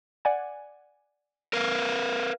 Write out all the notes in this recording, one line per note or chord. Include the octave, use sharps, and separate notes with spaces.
D5 F#5 G#5
A#4 B4 F5